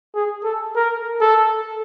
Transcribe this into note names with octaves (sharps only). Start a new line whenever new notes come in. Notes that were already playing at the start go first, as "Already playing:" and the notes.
G#4
A4
A#4
A4